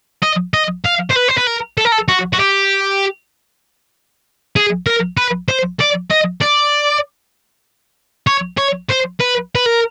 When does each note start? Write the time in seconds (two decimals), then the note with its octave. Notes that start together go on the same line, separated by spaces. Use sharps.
0.23 D#5
0.54 D#5
0.85 F5
1.10 C5
1.15 B4
1.28 C5
1.37 B4
1.47 A#4
1.77 A4
1.85 A#4
1.92 A4
2.08 F#4
2.33 F#4
2.39 G4
4.56 G#4
4.86 A#4
5.17 B4
5.48 C5
5.80 D5
6.10 D#5
6.41 D5
8.27 C#5
8.58 C#5
8.89 C5
9.20 B4
9.55 B4
9.66 A#4